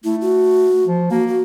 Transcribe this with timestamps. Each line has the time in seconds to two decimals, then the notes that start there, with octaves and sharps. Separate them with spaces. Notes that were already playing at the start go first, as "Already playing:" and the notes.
0.04 A3 E4
0.21 F#4
0.87 F3
1.11 A#3 F#4
1.28 F#4